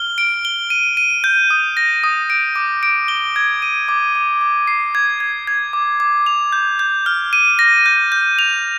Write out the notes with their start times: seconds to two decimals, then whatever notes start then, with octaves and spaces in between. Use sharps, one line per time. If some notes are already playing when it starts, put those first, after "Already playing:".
Already playing: F6 G7
0.18 D7
0.45 G7
0.70 D#7
0.97 D#7
1.24 G6
1.50 D#6
1.77 A#6
2.04 D#6
2.30 D7
2.56 D6
2.83 D7
3.08 G7
3.36 G#6
3.62 D#7
3.89 D6
4.15 D6
4.41 D6
4.67 C7
4.95 G#6
5.20 G#6
5.47 G#6
5.73 D6
6.00 D6
6.26 F7
6.52 G6
6.79 G6
7.06 F6
7.33 D#7
7.59 A#6
7.86 G6
8.12 G6
8.39 F7